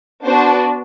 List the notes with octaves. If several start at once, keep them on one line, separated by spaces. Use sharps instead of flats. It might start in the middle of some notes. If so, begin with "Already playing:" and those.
B3 D4 F#4 C5